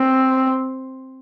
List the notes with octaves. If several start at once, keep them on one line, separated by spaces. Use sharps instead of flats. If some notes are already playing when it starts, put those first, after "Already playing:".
Already playing: C4